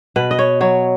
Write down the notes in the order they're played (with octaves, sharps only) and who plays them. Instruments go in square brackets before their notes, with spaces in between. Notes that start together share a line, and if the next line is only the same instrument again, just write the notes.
[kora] B2 B4
D#5
C#5
F#3 C#5